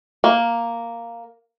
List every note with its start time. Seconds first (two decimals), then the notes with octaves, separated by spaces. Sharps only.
0.24 A#3